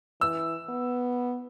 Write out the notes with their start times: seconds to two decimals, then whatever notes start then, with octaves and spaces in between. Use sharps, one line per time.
0.21 E3 E6
0.69 B3